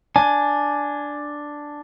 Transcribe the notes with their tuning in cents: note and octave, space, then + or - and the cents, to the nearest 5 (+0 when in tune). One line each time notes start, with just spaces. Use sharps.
D4 +0 G#5 +10